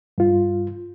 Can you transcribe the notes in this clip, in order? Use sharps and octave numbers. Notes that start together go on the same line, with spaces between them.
G2 F4